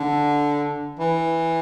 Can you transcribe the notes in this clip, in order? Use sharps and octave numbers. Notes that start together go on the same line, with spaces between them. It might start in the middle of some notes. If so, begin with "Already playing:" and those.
Already playing: D3
E3